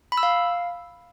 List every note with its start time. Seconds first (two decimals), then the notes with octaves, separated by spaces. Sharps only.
0.12 B5
0.17 E6
0.23 F5